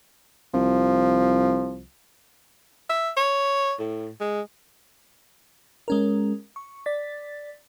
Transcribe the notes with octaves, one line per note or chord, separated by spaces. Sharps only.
C2 F3
E5
C#5
A2
G#3
G#3 C#4 A#4
C#6
D5 A6 B6